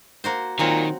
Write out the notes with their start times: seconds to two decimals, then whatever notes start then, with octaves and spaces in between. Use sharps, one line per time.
0.24 A#3 F#4 C5
0.59 A#2 D#3 F#3 C4 F#4